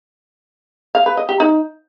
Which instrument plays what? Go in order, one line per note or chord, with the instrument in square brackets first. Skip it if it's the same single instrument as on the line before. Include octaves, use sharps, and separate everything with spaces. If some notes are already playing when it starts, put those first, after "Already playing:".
[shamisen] F5
B4
D#5
G4
D#4